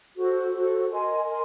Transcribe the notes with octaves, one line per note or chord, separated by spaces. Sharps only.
F#4 A4 C5
F#4 A4 C5
A#4 D#5 G#5 C6
A#4 D#5 G#5 C6